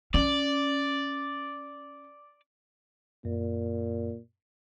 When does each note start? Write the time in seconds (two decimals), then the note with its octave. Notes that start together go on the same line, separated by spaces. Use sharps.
0.14 C#4 D5
3.25 F#2 A#2